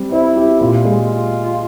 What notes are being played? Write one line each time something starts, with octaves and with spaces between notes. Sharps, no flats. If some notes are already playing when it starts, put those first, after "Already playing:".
Already playing: G3 C4
E4 C5
G4
A#2 F4
G#3